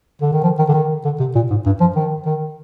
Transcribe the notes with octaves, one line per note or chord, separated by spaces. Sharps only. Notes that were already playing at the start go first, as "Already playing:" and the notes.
D3
D#3
F3
D#3
D3
D#3
D3
C3
A#2
G#2
G2
F3
D#3
D#3